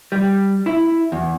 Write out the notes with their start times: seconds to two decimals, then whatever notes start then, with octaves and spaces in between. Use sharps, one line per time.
0.12 G3
0.66 E4
1.12 E2